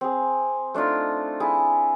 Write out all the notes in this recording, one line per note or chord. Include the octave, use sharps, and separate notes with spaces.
C4 G#4
A3 D4 D#4 F4
E4 G#4